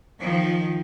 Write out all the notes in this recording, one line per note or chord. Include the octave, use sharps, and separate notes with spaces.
D#3 F3